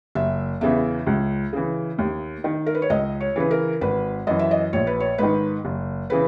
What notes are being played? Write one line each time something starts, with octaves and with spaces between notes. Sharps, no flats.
F#1 E5
E2 C#3 E3 E5
C#2
C#3 E3
D#2
D#3
A#4
B4
C#5
C#2 D#5
C#5
C#3 E3 B4
A#4
G#1 B4
F#2 E3 D#5
E5
D#5
A#1 C#5
B4
C#5
G#2 D#3 B4
F#1
C#3 E3 B4